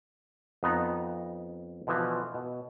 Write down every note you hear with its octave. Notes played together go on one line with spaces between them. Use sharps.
F2 B3 D#4 A#5
B2 D3 E3 F3
B2